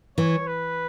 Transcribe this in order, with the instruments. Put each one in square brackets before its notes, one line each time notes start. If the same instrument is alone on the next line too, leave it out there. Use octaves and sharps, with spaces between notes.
[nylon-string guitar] E3 [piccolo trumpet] C#5
[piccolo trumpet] B4